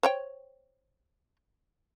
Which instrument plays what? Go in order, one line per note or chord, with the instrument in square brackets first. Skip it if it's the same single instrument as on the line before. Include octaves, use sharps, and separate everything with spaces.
[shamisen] C5 C#5 G5